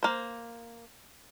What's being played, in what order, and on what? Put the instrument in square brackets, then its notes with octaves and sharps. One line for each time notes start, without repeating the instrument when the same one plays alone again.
[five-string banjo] A#3 C5